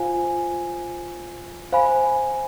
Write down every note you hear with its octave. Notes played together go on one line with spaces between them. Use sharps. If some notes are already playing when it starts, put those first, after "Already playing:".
Already playing: F4 C5 F5 G#5
C5 F5 G#5 B5